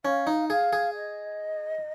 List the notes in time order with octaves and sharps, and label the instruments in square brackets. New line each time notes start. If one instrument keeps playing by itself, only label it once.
[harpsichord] C#4 [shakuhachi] F5
[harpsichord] D#4
[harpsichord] G#4 [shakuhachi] F5
[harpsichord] G#4
[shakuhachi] D#5